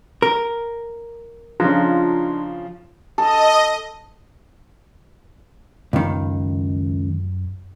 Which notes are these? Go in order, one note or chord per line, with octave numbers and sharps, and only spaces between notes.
A#4
C#3 F3 D4 D#4 F4
A4 D#5
C#2 F#2 D#3